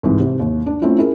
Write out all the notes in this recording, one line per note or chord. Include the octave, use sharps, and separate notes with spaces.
C2 G#2 E3
C3
D#2
D4
A3 C4 C#4 E4 F4
E4 G#4 A#4